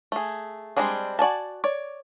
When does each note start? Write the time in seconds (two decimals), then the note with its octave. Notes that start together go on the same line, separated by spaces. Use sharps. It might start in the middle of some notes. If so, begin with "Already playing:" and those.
0.12 A3 G#4
0.77 G3 G#3 C4 D4 G#4
1.19 F#4 D5 G#5 A5
1.64 C#5 D5